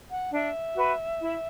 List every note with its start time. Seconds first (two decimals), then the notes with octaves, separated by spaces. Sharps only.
0.11 F#5
0.33 D4 E5
0.76 F#4 B4
1.21 E4